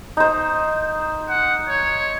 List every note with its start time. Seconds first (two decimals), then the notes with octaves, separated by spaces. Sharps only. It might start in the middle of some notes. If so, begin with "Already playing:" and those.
0.17 D#4 C5
1.29 F#5
1.69 C#5